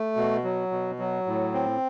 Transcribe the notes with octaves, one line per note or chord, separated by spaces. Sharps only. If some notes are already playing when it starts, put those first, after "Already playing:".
Already playing: A3
B2
F#3
B2
F#3
A2
C4